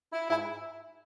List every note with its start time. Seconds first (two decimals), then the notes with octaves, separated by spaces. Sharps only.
0.12 E4
0.29 G#2 E4